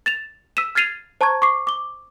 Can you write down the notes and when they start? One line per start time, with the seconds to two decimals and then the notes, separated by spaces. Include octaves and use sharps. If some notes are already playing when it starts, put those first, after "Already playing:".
0.06 A6 E7 F7
0.57 E6 B6 D#7 E7
0.75 F6 G#6 A6 C7 D#7 F7
1.21 C5 A5 A#5 C#6 G#6
1.42 C#6 D6 C7
1.67 D6 G7